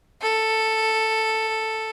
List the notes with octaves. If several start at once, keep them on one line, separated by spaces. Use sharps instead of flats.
A4